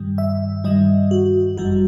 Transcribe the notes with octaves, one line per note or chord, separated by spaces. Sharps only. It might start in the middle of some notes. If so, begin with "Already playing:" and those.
Already playing: G2 D#3 G3
E5
G2 D#3 G3 D#5
F#4
G1 F#2 E3 G3 F#4